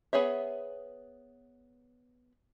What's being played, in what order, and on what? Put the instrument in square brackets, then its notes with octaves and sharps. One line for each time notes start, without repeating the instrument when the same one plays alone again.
[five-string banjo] B3 G#4 C#5 E5